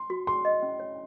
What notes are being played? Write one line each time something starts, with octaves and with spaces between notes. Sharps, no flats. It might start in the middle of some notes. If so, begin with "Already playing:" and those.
Already playing: C6
F#4
G#4 C6
D#5
C#4
C#5